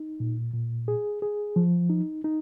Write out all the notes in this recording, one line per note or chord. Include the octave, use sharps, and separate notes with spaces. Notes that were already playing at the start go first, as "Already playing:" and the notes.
Already playing: D#4
A#2
A#2
G#4
G#4
F3
D#4
D#4